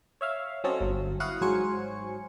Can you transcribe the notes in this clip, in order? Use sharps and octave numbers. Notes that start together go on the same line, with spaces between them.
C#5 E5 F5
F#3 C4 C#4 A4 D#5
G1 F#3
E4 F#4 F5 F#5 D#6
G#2 F#3 C5 G#5 C#6 C#7